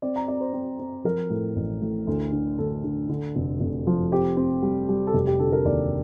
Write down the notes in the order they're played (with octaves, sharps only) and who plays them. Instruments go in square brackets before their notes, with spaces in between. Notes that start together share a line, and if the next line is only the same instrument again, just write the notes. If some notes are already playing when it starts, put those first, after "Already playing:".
[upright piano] C4 D5
A#5
C4 D5
C5
C4
C4
F3 A#4
A2
A1
A2
D2
D3
D2 A4
D3
D3
F1
F1
F3
C4 G4
C4
G3
G3
A4
F1 G4
G4
D3 A4
A#4
D#2 D5